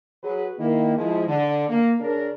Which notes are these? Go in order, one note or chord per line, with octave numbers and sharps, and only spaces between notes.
F#3 G#4 B4
D#3 A#3 E4
F3 G#3 E4
D3
A#3
C#3 D4 A#4